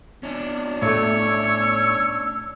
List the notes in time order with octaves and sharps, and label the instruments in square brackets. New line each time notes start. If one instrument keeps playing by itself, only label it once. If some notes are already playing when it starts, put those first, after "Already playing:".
[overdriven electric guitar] C#4 D4
[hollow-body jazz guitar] A2 A3 [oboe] C#5 [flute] E6